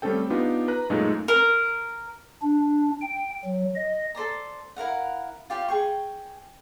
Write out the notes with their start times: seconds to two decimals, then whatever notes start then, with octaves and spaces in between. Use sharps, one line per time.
0.02 G3 A3 C4 C#4 A4 G5
0.30 B3 D4 D#4 F4 G4
0.68 B4 A#5 F#6
0.90 F#2 A#2 G#3 A3 D#4
1.28 A#4
2.42 D4
3.01 G5
3.44 F#3
3.75 D#5
4.15 A4 C5 D5 A#5
4.76 E4 A#4 F5 F#5
5.50 F4 G4 F5 G5
5.68 G#4 G5 C#6